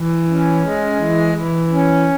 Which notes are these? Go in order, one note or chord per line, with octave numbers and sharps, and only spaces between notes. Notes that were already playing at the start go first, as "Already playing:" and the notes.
Already playing: E3
C#4
G#3
E3
E3
C#4